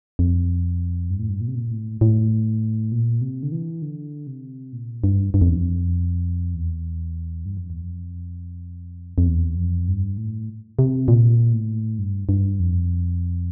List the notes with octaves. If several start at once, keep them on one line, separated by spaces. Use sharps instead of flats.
F2
G2
A2
G2
A#2
C3
A#2
A2
A2
A#2
C3
D3
E3
D3
C3
A#2
G2
G2
F2
E2
F2
E2
G2
F2
E2
F2
F2
E2
F2
G2
A2
C3
A#2
A2
G2
G2
F2